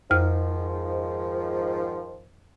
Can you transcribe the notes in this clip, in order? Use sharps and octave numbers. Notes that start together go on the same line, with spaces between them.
F2 G#2 D#3 F3 F6